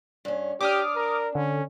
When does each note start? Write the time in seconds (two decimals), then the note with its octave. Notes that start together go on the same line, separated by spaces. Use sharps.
0.25 G2 C#4
0.61 D4 G4 D6 D#6 F6
0.96 A#4
1.35 D3 C#4